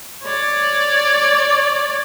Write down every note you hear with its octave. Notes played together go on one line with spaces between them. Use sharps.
C#5 D5